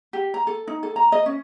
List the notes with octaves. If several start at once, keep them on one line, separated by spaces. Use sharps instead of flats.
G4
A#5
A4
D#4
A4
A#5
D#5
C#4